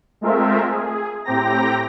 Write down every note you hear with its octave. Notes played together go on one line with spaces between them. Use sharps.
G#3 A3 C4 F4 A#4 E5
G#4
A2 C4 G4 G5 A#5 A#6